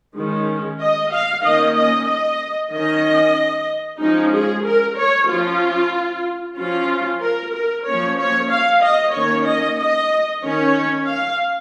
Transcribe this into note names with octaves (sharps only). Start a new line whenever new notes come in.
D#3 G#3 C#4
D#5
F5
D#3 A#3 C#4 D#5
D#5
D#5
D#3 C#4 D#5
F3 G#3 C#4 D#4
G#4
A#4
C#5
F3 C#4 F4
F3 C#4 F4
A#4
A#4
F3 A#3 C#4 C#5
C#5
F5
D#5
D#3 A#3 C#4 C#5
D#5
D#5
D#3 C#4 C#5
F5